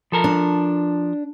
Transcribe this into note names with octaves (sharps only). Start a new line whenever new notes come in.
F3 A4 A#4
D4